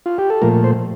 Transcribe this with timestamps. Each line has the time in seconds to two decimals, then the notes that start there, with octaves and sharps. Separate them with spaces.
0.06 F4
0.18 G4
0.30 A4
0.42 A#2 F3 A3 A#4
0.64 C5